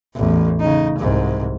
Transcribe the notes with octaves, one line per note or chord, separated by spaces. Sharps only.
A1 E2
C#3 D#4
C2 G#2